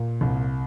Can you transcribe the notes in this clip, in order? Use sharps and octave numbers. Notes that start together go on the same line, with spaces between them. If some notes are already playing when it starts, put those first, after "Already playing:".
Already playing: A#2
C2